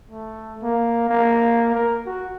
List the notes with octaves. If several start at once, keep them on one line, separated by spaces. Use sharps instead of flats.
A3
A#3
A#3
A#4
F#4